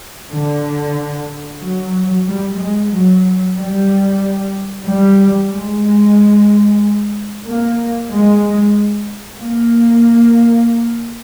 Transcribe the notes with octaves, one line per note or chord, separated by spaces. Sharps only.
D3
F#3
G3
G#3
F#3
G3
G3
G#3
A#3
G#3
A#3